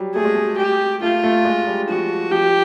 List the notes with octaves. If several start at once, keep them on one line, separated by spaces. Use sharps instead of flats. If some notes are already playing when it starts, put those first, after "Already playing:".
Already playing: F#3 G3
A3 G#4
G#3
A3
G4
A3 F4
A3
G#3
G3
F3 F#4
F3 G4